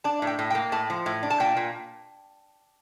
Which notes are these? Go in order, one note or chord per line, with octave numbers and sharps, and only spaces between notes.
D4 A5
A2
G5
A2
G5
A#3
A2 A5
F3
A2
D4
A5
A#2 G5
A#2